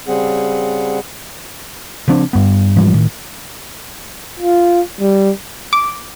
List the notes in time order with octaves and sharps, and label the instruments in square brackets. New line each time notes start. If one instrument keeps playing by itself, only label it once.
[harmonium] C#3 G3 C4 G#4 F#5
[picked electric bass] C#3 F3 C4 D4
G2 B3
G#2 E3 F3 G3
A2 D#3
[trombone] F4
G3
[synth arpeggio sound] D6